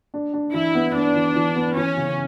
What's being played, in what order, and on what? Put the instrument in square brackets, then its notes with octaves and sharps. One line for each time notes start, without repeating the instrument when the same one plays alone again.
[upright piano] D4
D4
[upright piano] E3 [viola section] E4
[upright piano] B3
[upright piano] B3 [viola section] D4
[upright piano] E3
E3
B3
[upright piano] E3 [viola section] C#4
[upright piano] C#3